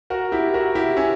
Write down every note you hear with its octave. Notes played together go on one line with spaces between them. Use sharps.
F#4 A#4
E4 G4
F#4 A#4
E4 G4
C#4 E4